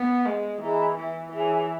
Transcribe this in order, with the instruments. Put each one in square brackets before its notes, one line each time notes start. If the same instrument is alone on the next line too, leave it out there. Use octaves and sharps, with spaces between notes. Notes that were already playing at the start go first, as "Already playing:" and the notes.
Already playing: [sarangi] B3
G#3
[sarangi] E3 [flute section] E4 G#4 D#5 A#5
[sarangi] E3
[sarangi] E3 [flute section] G#4 C#5 G#5